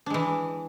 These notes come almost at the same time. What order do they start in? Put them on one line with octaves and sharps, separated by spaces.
D4 G#3 E3